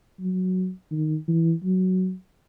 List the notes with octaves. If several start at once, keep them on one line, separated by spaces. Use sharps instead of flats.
F#3
D#3
E3
F#3